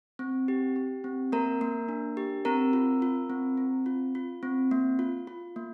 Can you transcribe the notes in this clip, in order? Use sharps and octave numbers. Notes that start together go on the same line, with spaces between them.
C4
G4
G4
C4
A#3 A#4 A#5
A#3
D4
G4
C4 A#4 A#5
F4
F4
C4
C4
F4
F4
C4
A#3
F4
F4
A#3